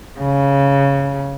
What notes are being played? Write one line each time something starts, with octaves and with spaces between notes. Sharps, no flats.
C#3